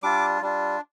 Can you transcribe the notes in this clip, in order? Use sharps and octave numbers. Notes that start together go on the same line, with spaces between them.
G3 D4 F4 D6
G3 D4 F4